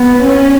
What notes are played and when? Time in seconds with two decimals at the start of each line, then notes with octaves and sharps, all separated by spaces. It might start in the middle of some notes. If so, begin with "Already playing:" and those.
Already playing: B3
0.26 C#4